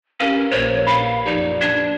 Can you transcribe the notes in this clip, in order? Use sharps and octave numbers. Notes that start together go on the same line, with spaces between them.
C#4 G4 A#4 B4 F5
A#1 C5 C#5
F5 B5 G7
F#2 A#2 F3 D#4 G4 B4 D5
D4 G#6